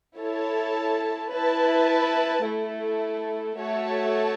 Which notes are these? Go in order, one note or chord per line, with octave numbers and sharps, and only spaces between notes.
E4 A4 C#5 A5
E4 B4 A5
A3 E4 A4
A3 F#4 C#5 E5 A5